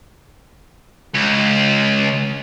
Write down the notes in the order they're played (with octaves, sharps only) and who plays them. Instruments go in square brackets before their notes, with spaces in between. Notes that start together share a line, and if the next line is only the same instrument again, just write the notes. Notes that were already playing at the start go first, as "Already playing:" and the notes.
[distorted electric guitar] C#2